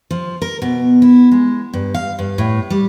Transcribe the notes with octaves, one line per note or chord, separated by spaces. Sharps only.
F3
A#4
B2
E4
G#3
G2
F5
G2
A2
G3